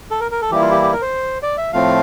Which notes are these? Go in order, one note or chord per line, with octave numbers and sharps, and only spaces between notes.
A4
A#4
A#4
A4
E3 G3 A#3 E4 G4
F4
G4
G4
A#4
C5
D5
E5
A2 F3 A3 C4 F4 F5